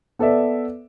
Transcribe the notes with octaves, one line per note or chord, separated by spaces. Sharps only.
B3 A4 B4 D5 E5